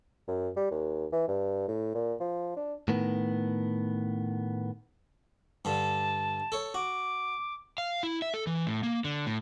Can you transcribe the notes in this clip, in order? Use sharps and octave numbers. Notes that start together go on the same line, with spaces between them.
F#2
G3
D#2
E3
G2
A2
A#2
F3
D4
A2 D#3 B3
G2 D3 A5
A4 C#5
F#4 D6
F5
E4
E5
A4
E3
A2
A#3
D3
A2